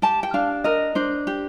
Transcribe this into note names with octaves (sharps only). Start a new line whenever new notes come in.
G4 A5
G5
D4 F5
A#4 D#5
D4 C5
G4